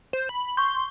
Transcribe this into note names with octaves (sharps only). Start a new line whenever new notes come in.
C5
B5
C6 C#6 G6